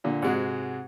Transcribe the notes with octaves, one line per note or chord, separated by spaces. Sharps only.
A#2 D3
G#2 C3 G#3 F#4 F#5